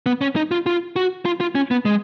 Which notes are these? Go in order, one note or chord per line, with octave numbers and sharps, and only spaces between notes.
B3
C#4
D#4
F4
F4
F#4
F4
F4
C#4
B3
G#3